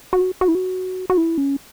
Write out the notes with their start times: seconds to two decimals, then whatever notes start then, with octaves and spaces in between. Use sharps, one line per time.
0.13 F#4
0.41 F#4
0.48 E4
0.55 F#4
1.10 F#4
1.17 E4
1.38 C#4